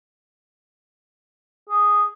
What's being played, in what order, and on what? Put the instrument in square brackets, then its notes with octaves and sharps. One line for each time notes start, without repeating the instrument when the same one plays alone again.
[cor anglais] G#4